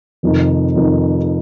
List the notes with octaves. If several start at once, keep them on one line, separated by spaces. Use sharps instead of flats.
F1 F2 D#3
F1 F2 D#3